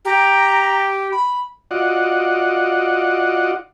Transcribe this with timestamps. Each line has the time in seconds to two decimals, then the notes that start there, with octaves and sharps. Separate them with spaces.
0.05 G4 A#5
1.11 B5
1.71 F4 F#4 D5 D#5 F#5